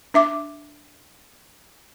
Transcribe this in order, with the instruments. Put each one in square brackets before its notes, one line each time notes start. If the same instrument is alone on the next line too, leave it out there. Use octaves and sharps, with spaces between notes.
[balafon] D4 E5 D6